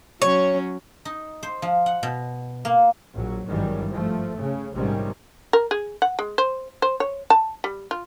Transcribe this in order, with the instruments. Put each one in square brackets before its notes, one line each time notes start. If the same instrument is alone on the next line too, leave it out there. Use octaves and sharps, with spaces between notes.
[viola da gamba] F#3 C#4 [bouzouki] C#5
[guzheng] D#4
C5
F3
F#5
B2
A#3
[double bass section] A#1 F#3
G#1 G2 D#3 E3 F#3 G3
F3 A3
C#3
A#1 G#2 C3 D#3 G3 C#4
[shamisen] A#4
G#4
F#5
G#3
C5
C5
C#5
A5
G3
F4